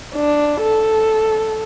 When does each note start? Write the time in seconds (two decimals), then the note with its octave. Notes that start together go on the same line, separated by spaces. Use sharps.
0.16 D4
0.62 A4